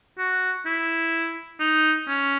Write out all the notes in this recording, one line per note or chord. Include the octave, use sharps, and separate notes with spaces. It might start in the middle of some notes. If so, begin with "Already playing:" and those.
F#4
E4
D#4
C#4